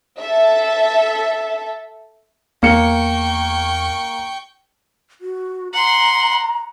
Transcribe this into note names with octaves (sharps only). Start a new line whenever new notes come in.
A4 E5
E2 A#3 G5 C#6 C#7
F#4
F#5 A#5 C6